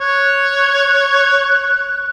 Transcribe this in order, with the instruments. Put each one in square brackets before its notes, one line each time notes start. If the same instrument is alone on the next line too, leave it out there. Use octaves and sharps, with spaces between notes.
[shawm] C#5 [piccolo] F#6